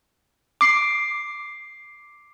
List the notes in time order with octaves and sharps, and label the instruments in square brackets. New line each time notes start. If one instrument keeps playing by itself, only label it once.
[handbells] D6 C7